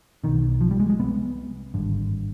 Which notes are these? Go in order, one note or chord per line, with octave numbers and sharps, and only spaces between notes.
B1 B2 D#3
F3
G3
G#3
G#3
C2 C3 B3
G#1 G2 D3